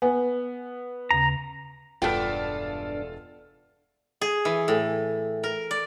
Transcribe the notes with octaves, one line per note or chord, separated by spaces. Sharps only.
B3 G#5
D#2 C#3 A#5
E1 G2 B3 D4 F4 A4 G5 F6
G#4
E3
A2
A#4
D5